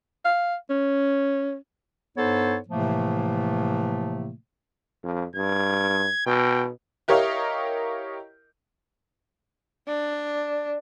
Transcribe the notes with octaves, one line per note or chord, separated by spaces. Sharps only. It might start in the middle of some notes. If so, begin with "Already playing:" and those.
F5
C#4
G2 B3 D#4 A4 C5 C#5
A2 C3 E3 F3 A3 A#3
F2
G2 G#6
B2 G5
E4 G4 A#4 C#5 D#5 F5
D4